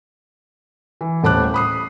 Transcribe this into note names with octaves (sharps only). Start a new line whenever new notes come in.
E3
D#1 A2 A5 D6 F#6
B5 D#6 C7